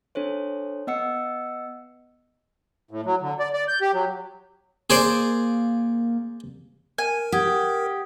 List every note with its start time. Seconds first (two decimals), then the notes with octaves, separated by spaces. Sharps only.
0.15 D4 A4 C5 C#5
0.87 B3 D#5 F#5 E6 C#7
2.91 A2
3.06 F#3
3.21 D3
3.39 D5
3.54 D5
3.68 G6
3.81 G4
3.94 F#3
4.90 A#3 G#4 C5 D5
6.98 A#4 G#5
7.32 G4 F#5 D#6 G#6